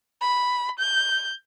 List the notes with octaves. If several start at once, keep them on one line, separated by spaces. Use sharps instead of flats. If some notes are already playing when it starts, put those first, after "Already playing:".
B5
G6